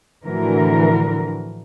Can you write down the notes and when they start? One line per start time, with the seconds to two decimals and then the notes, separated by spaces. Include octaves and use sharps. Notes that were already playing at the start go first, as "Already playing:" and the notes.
0.23 A2 D3 E3 F3 F#4 A#4